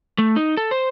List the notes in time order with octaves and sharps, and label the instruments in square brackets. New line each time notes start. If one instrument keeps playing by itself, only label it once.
[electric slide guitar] A3
D#4
A4
C5